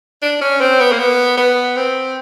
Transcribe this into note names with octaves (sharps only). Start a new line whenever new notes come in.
D4
C#4
C4
B3
A#3
B3
B3
C4